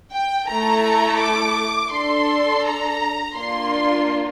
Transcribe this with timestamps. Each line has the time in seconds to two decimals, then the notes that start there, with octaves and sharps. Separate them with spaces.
0.12 G5
0.48 A3 E4 A4 A#5
1.20 D6
1.92 D4 A4 C6
2.64 A#5
3.36 A#3 D4 F4 C6